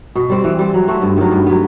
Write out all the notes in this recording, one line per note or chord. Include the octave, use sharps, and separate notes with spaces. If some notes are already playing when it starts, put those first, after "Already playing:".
B2
G3 C4
E3
G3 C4
F#3
A3 C4 F#4
G2
D#3 F#3
G2
F#3 B3